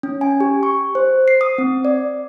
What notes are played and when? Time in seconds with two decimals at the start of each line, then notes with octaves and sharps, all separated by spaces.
0.03 C#4
0.21 G#5
0.40 G4
0.63 C#6
0.95 C5
1.28 C7
1.41 D#6
1.58 C4
1.85 D5